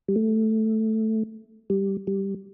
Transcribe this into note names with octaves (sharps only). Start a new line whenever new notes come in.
G3
A3
G3
G3